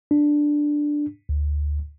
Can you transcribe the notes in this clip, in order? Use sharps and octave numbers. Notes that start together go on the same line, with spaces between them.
D4
D2